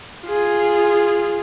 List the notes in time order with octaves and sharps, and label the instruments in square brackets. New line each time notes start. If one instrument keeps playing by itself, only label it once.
[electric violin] F4 G#4